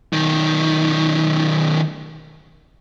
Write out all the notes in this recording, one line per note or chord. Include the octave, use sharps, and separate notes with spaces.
B1 D#3